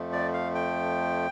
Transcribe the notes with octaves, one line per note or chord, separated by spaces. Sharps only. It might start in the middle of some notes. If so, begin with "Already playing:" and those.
Already playing: F2 F3 A3
D5
F5
G5